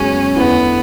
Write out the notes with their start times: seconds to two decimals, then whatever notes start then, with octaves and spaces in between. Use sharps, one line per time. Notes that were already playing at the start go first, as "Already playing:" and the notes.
Already playing: F#2 C#3 G#3 B3 C#4 F#4
0.36 E2 D3 A3 B3 E4